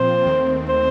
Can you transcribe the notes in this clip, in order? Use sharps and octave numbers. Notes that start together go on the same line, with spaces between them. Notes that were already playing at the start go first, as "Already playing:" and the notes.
Already playing: A#2 F3 C4 F4 C5
D#2 D#3 A3 C4
C5